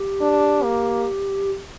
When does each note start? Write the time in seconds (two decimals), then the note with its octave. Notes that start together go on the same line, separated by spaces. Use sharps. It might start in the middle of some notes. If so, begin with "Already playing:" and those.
Already playing: G4
0.21 D4
0.63 A#3